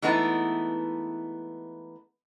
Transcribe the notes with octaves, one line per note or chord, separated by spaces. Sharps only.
E3 G#3 A3 B3 D#4 E4